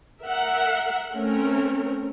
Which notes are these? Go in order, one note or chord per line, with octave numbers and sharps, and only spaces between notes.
A#4 E5 F#5
A3 C4 C#4 A#4